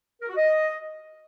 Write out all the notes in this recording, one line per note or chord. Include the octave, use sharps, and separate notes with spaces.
A#4
F#4
D#5